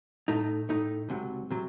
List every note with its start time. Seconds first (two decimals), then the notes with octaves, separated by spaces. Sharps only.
0.28 A2 A3 D#4
0.69 A2 A3 D#4
1.09 C#2 C3 F#3
1.51 C3 F#3